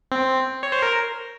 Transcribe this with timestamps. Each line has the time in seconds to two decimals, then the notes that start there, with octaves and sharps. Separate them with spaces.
0.12 C4
0.63 C#5
0.72 C5
0.82 A#4